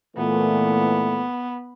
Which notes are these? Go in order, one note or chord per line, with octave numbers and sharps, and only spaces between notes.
A#2 E3 A3 B3